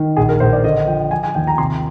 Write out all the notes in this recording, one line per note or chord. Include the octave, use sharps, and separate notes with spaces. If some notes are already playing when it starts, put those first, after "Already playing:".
Already playing: D#3
A#1 G#4
A#4
A#1 C5
D5
D3 D#5
F3 G5
F3 G#5
G#5
D#2 G5
A#5
C3 C6